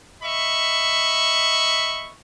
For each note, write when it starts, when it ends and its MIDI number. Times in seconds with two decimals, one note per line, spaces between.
0.23 2.14 75
0.23 2.14 76
0.23 2.14 83
0.23 2.14 85